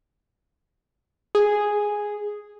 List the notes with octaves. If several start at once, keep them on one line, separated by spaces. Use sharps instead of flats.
G#4